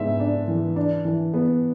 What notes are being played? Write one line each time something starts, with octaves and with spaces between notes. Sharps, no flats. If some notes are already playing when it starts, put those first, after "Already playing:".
Already playing: G#2 B3 E5
D4
E3
D4
E3
B3